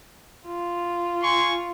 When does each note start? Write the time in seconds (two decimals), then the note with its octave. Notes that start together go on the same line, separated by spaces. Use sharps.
0.46 F4
1.22 G#5 C6 C#6